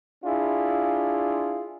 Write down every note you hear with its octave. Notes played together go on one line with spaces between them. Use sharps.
D4 E4 F4 G#4